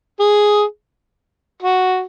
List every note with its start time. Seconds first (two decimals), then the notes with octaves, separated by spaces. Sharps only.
0.20 G#4
1.62 F#4